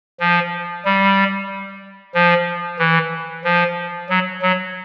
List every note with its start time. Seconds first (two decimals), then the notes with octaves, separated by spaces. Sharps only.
0.20 F3
0.85 G3
2.14 F3
2.79 E3
3.44 F3
4.09 F#3
4.42 F#3